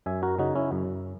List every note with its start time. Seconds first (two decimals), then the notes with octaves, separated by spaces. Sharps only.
0.06 F#2 E5 G#5
0.23 F#4 A#4
0.39 C#3 D#4 F#4
0.55 C#4 E4
0.72 F#2